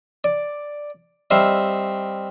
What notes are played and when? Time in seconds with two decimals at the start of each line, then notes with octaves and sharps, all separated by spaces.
0.24 D5
1.31 G3 C4 D#4 E5 F5